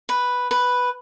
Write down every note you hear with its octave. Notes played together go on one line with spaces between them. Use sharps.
B4
B4